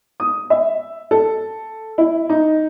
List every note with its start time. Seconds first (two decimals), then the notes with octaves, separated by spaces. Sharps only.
0.20 D#6
0.50 E5
1.11 A4
1.98 E4
2.29 D#4